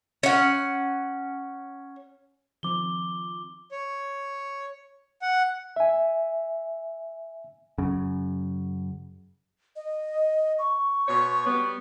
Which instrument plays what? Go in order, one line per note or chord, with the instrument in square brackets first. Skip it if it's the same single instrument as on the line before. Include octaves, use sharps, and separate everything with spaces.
[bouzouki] C#4 F#5
[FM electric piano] D#3 F3 C4 [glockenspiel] D6 G7
[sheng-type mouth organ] C#5
F#5
[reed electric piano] E5 G#5
[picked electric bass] F#2 C#3
[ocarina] D#5
C#6
[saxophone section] B2 C5 C#5
G3 B3